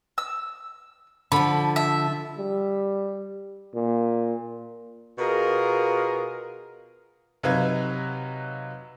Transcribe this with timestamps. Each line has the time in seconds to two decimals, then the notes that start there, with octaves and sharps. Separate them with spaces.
0.18 E6
1.32 D3 F3 B5
1.76 E5
2.38 G3
3.75 A#2
5.18 B2 F4 G#4 A#4
7.43 C3 F#3 D#4 B4 F5 G#6